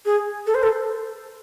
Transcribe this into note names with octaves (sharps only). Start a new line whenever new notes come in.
G#4
A4
C5
A4